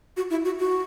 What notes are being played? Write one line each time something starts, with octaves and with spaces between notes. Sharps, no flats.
F#4
E4
F#4
F#4